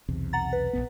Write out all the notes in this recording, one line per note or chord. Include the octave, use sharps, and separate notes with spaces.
B1 E2 C3
F#5 A#5 A6
B4
A#1 F2 B3